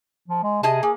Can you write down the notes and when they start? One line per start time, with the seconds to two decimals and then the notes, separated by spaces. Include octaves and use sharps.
0.28 F3
0.43 G#3
0.63 C3 G#4 D#5 A5
0.83 A#3 G#4